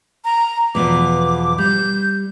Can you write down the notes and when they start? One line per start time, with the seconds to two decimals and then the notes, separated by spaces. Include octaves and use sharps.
0.25 A#5
0.75 E2 B2 F3 D6
1.58 G3 G6